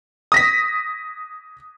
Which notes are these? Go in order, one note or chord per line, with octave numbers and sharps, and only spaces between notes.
D#6 A#6 B6